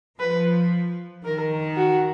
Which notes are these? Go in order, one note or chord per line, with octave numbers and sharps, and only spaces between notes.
F3 B4
D#3 A#4
F#4